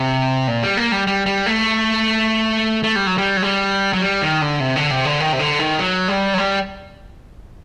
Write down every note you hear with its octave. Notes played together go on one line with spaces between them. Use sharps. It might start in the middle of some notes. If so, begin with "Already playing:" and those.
Already playing: C3
A#2
G3
A#3
G3
G3
G3
A3
A3
G3
F#3
G3
F#3
G3
F#3
G3
D#3
D3
C3
D3
C3
D3
D#3
C3
D3
D#3
F#3
G3
F#3
G3